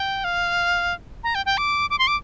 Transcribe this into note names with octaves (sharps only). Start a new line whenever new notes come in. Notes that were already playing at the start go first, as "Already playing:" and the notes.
Already playing: G5
F5
A#5
G5
G5
D6
D6
C6
D6